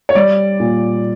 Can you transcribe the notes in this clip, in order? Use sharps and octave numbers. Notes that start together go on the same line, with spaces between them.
C#5
G3 D5
A#2